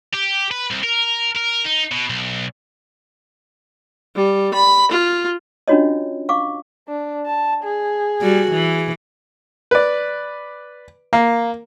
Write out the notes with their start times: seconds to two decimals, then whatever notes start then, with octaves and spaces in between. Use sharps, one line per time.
0.14 G4
0.51 B4
0.71 C2
0.84 A#4
1.36 A#4
1.65 D#4
1.92 B2
2.10 B1
4.15 G3
4.54 B5
4.91 F4
5.68 C#4 D4 F4 F#4 C#5 D#5
6.29 F5 C#6 D6
6.88 D4
7.26 A5
7.64 G#4
8.22 G3 F#4
8.52 E3
9.71 B4 D5
11.13 A#3